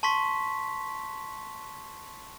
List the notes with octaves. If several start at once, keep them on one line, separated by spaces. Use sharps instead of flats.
A5 C6 C#6 B6